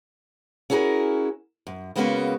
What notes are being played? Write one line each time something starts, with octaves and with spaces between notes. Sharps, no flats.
C#4 E4 F#4 G#4 A#4
F#2
C#3 G#3 A#3 B3 C#4 F#4